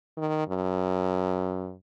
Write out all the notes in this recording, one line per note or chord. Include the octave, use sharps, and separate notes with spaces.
D#3
F#2